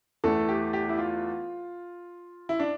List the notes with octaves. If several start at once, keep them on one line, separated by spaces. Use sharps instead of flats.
E2 E3 A3 A4
G4
G4
E4
F4
E4
D4